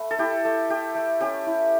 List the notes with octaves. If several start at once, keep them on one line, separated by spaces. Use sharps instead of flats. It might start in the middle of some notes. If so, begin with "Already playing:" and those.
Already playing: A3 B4
A4
E4 G4
A3
A3 G4
A3
C#4 G4
E4